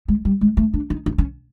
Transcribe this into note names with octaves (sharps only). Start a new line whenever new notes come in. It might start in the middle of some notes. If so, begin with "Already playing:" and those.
G#3
G3
G#3
A3
D4
D#4
D#4
C#4